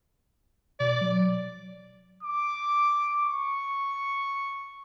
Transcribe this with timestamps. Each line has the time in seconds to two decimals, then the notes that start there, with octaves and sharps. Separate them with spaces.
0.80 B2 D5
1.01 F#3
2.23 D6
3.21 C#6